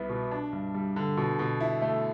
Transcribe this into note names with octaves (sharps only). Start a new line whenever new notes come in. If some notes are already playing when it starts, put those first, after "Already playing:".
Already playing: C2 B3 E4
B2
D4
G2
G3
D3
B2
B2
E4
A3